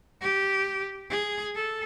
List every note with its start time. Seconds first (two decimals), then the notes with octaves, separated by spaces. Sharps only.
0.21 G4
1.10 G#4
1.55 A4